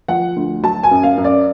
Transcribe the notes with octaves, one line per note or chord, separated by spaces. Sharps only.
F3 F#5
D2
F#3 A5
G#5
F#2
F5
F#2
D5